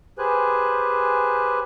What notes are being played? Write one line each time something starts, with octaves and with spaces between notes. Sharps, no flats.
G4 G#4 B4 C5 G#5 F#6